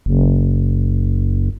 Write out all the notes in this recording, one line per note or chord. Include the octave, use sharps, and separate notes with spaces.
F#1